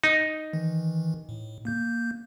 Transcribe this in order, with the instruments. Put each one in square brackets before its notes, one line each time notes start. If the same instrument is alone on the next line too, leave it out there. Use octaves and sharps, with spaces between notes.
[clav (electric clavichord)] D#4
[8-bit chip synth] D#3 E3
A2
A#3 G6